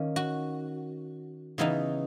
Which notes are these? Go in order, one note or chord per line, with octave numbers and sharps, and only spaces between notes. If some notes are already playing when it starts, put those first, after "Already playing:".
Already playing: D#3 A#3 C#4
F#4
C#3 E3 B3 D#4